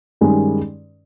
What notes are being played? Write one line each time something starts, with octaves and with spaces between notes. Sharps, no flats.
G2 D#3 G#3 C#4